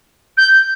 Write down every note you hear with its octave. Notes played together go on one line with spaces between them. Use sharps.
G6